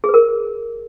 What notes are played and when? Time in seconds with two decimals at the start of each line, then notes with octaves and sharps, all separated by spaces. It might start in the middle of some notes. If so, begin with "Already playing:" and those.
0.04 G#4
0.09 B4
0.14 A#4